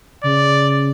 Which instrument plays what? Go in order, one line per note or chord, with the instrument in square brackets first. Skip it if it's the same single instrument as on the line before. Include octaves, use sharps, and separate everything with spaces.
[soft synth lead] C#3 [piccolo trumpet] D5